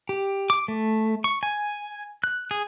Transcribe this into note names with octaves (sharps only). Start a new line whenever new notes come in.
G4
D6
A3
C#6
G#5
F#6
G#4